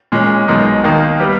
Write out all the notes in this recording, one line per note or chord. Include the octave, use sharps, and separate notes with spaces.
A#2 G#3 C#4
B1 B2 G#3 D#4 A#4
D#2 D#3 A#3 D#4
G3 B3 G4